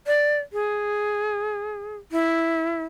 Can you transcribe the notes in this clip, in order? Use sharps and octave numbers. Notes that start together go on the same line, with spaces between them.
D5
G#4
E4